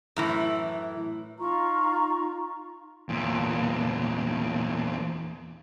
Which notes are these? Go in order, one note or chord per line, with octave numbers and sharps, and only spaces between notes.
F#2 A2 E3
D#4 F4 A#5 C#6
E2 A#2